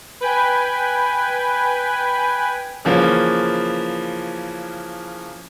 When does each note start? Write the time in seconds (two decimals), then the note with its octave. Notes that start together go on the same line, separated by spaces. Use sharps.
0.21 B4 G5 G#5
2.85 C#3 E3 F3 A#3 C#4